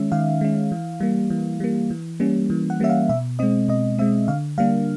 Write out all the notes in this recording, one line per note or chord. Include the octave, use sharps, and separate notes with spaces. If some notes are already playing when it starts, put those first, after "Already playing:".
Already playing: D#3 G#3 C#4 E5
D#3 F5
G#3 C#4
E3
G3 A#3
E3
G3 A#3
E3
G3 A#3 C#4
E3
F#5
G3 A#3 C#4 E5
F5
B2 E5
G#3 C4 D#5
B2 D#5
G#3 C4 E5
D3 F5
G3 A#3 D4 F5